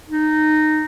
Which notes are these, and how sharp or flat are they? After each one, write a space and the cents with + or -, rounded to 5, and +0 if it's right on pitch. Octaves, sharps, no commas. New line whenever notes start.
D#4 -15